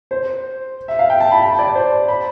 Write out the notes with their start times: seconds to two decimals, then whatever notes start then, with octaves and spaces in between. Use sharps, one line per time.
0.11 C5
0.88 E5
0.99 F5
1.10 G5
1.20 A5
1.32 B5
1.43 A5
1.59 D5
1.75 C5
2.08 B5